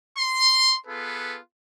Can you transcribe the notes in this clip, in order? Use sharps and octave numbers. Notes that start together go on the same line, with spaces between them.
C6
B3 F4 G#4 A4 B4